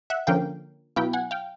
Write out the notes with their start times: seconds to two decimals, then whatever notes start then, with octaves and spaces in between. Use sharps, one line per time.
0.10 E5 F#5
0.27 D3 F3 A#3 C#4 F5 G5
0.96 B2 F#3 B3 E4 F5 G5
1.13 F#5 G#5
1.31 F5 G5